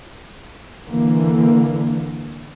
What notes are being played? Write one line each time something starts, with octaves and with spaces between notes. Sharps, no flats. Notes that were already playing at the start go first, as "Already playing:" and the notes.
D3 E3 A#3